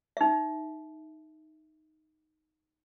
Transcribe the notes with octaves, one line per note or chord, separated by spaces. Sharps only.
D#4 E5